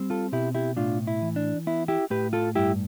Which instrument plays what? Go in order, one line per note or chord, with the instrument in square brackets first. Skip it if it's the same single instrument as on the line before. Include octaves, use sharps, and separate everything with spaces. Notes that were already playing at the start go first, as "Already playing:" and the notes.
Already playing: [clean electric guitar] G3 C4
F4 A4
B2 E4 G4
E4 G4
A2 D4 F4
E4
E3
D4
B3 E4
E4 G4
A2 G4 B4
F4 A4
G2 E4 G4